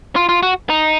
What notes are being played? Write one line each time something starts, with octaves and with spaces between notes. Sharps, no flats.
F4
F4
F#4
D#4